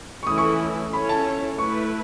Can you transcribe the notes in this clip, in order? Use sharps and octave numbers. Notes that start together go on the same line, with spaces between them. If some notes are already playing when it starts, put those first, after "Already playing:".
C#6
E3 A3 C#4 E4 A4 D#6
C#6
C#4 E4 A4 C#5 B5
A5
A3 E4 B4 C#6